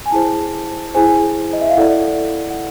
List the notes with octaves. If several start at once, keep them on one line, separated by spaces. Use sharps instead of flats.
G#5
E4 G#4 C5 A5
E4 G#4 C5 G#5
D#5
E5
F5
E4 A4 D5 F#5
F#5